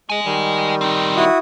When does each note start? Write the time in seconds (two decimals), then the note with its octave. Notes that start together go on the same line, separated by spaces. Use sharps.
0.10 G#3 D#5 G#5
0.25 D#3 G3
0.81 C4 D#4 A#5
1.16 E4 F#4 D#6